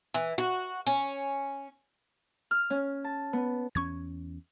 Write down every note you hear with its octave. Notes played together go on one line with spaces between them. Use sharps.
E3
F#4
C#4
F6
C#4
A5
B3
E2 C#4 C#6 G#6